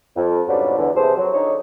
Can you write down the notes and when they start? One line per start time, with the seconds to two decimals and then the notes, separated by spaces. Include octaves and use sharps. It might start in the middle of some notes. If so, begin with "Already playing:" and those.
0.16 F2
0.48 G#2 C#3 F#3 G3 B3 D4
0.77 E2 D3
0.96 C#2 C3 E3 G#4 A4 C5
1.17 F#3
1.34 D3 D#4 C#5